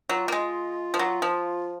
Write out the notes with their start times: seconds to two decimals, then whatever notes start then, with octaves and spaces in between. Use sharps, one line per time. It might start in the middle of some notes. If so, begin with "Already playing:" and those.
0.09 F#3 F4
0.28 A#3
0.32 G#3
0.94 F3
0.99 F#3
1.22 F3